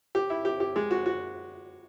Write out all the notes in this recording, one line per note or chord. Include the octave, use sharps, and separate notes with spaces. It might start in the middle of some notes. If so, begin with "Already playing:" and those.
G4
E4
G4
G4
G#3
F#4
F#4